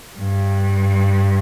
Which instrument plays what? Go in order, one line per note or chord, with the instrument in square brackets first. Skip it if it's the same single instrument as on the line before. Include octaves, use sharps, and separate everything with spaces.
[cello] G2